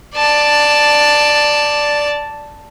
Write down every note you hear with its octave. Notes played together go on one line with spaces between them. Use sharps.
D5 A5